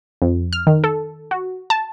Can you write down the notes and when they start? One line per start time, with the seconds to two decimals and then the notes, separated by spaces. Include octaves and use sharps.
0.22 F2
0.53 F6
0.67 D#3
0.84 A4
1.31 F#4
1.70 A5